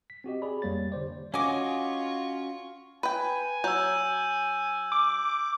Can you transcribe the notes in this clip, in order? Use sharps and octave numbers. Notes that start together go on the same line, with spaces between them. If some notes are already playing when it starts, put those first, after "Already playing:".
B6
C4 F#4 G4 D#5
G#4 D5 B5
F2 G3 A#3 C#5 A6
D3 G4 C5 D5
C#4 F4 F#4 D#5 G#5 C#6 D6
B4 G5 G#5
F#3 E6 G6
D6